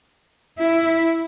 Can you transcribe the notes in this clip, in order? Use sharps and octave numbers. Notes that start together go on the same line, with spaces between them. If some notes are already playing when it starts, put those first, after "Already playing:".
E4